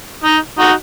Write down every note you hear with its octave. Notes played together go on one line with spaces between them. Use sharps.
D#4
D#4 F#4